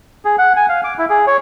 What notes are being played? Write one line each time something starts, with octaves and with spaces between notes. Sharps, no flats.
G#4
F#5
G#5
F5
D6
E4
G#4
C#5